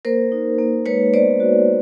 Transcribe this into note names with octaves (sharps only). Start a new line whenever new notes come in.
A#3 A#4 C5
D#4
A#3
G#3 B4 C#5
B3 C5 D5
F#4